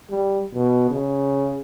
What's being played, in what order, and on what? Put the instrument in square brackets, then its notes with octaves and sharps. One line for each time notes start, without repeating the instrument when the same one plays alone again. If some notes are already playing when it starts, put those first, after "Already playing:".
[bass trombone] G3
B2
C#3